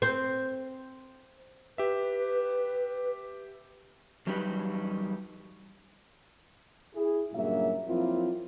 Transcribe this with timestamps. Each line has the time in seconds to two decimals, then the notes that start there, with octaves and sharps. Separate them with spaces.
0.02 C4
1.78 G4 B4 E5
4.27 E2 F#3 G3 D#4 G4 B4
6.95 E4 G#4
7.33 G2 A#2 C#3 F#3 A#3 E5
7.87 F2 F#3 A#3 C4 E4 F4